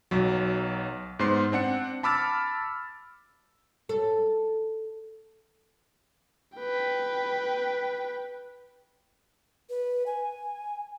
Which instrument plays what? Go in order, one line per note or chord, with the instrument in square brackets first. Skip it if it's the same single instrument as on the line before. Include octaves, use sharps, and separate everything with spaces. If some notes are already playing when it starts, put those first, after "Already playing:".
[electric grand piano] B1 F#3
G#2 B3 C5 C6 C7
C4 D4 F#5 C#7
A5 B5 D6 E6 F6 A6
[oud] A4
[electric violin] B4 G5
[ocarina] B4
G#5